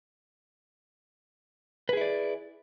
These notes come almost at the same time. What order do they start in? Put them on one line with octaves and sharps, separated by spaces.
B4 G#4 E4 D5